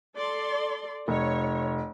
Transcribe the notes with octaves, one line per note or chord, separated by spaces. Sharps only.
A4 D5 C6
F1 C#5